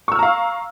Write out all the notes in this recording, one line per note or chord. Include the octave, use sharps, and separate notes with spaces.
F5 A#5 C#6 E6 F6